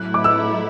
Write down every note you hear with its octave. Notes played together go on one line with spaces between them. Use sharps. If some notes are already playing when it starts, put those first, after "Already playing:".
Already playing: A2 F#3 A3 E4 F#6
D6
E6